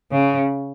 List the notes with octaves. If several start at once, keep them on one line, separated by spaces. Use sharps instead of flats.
C#3